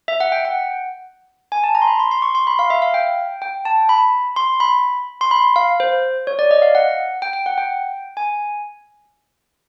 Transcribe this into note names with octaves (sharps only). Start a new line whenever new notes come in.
E5
F#5
G5
F#5
G#5
A5
A#5
C6
B5
C6
C6
C#6
C6
B5
F5
E5
F5
G5
G5
A5
B5
C6
B5
C6
B5
F5
C5
C#5
D5
D#5
F5
F#5
G5
G5
F#5
G5
G#5